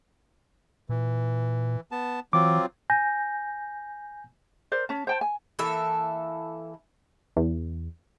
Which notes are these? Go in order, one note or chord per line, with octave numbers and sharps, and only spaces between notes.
A#2 E3
B3 A5
E3 F#3 C4 F4 D6
G#5 G6 A#6
A#4 C5 D5
C#4 A5
C5 G5 A5
G#5
E3 A#3 A4 E5
E2